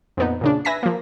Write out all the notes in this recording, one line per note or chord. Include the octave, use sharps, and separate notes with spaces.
F2 A#2 B3 D#4
A#2 C#3 D4
B4 E5 G#5 A#6 B6
F3 A#3